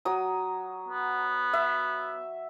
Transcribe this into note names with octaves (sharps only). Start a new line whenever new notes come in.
F#3 D#6
B3
E5